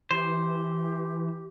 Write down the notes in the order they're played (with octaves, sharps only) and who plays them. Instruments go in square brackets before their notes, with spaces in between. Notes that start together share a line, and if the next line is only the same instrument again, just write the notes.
[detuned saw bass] E3 [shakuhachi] G4 [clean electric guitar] C5